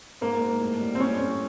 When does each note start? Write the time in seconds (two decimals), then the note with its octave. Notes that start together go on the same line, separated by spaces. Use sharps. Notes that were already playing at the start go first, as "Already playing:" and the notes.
0.21 G#2 A#3
0.41 G#2
0.61 A2
0.80 G3
0.95 C4
1.00 A2 C#4
1.19 A2